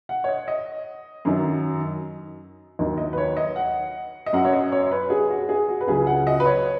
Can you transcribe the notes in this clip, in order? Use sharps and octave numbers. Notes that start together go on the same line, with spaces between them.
F#5
C#5
D#5
D#5
F#2 D#3 F#3
D#2 D#3 F#3
D#5
B4
C#5
D#5
F#5
D#5
F#2 F#3 F#5
C#5
D#5
C#5
C#5
B4
G#4
F#4
G#4
F#4
B4
C#2 C#3 F#3 G#4
F#5
D#5
B4
C#5